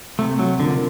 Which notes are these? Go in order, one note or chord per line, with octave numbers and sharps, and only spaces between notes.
C3 A3
F#3
D3 F3 A#3